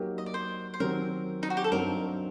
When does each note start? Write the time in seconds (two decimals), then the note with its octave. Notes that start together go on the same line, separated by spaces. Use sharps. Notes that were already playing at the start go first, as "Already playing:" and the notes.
Already playing: F#3 A#3 D#4 G4 A#4
0.18 D#5
0.26 D5
0.34 C5
0.74 C5
0.80 D#3 F#3 C4 G4 A#4
1.43 D#4
1.50 F#4
1.57 G4
1.64 A4
1.72 G2 F#3 C4 D#4 A#4